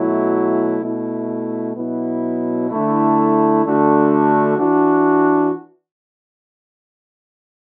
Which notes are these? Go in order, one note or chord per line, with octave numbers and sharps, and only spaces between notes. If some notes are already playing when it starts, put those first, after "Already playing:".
Already playing: B2 F#3 A3 E4
B2 A3 E4
B2 F#3 B3 E4
D3 A3 E4
D3 A3 D4 F#4
E3 D4 F#4